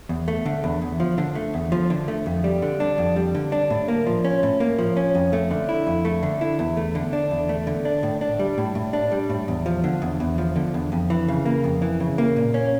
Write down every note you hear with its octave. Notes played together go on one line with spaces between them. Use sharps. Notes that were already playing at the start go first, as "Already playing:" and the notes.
E2
A3
D3
E2
E2
F3
D3
A3
E2
F3
D3
A3
F2
G3
D3
D4
F2
G3
D3
D4
A2
A#3
F3
C#4
A2
A#3
F3
C#4
F2
A3
D3
E4
F2
A3
D3
E4
E2
A3
D3
D4
E2
A3
D3
D4
A2
D4
G3
A2
A2
D4
G3
A2
E2
F3
D3
E2
E2
F3
D3
E2
F2
E3
C#3
A#3
F2
E3
C#3
A#3
A#2
C#4